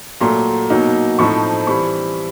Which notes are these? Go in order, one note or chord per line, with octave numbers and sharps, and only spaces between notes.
A#2 F#3 A3 A#5 C6
B2 F#3 A#3 D#4
A2 F3 A3 C4 D#4 B5 C#6
E3 G3 C4 B5 C#6